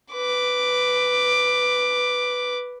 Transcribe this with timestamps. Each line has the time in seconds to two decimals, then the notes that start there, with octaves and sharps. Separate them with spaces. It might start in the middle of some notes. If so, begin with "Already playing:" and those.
0.13 B4 D6